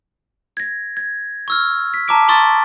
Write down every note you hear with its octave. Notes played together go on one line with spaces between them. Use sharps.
G#6 A#6
G#6
C#6 E6 F6
B6
A5 A#5 C#6 D6 B6 D7
A5 A#5 C6 C#6 D#6 A6